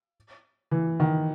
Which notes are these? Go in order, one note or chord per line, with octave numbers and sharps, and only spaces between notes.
E3
D#3